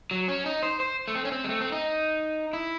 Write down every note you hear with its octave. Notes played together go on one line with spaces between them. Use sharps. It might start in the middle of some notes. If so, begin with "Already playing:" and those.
F#3
C#4
D#4
C5
C5
A3
C4
C#4
C4
G#3
A3
C4
D#4
E4